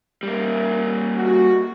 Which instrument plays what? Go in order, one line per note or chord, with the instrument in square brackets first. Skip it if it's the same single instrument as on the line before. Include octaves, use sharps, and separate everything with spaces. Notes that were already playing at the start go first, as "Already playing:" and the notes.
[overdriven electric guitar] G3 A#3
[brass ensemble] F#4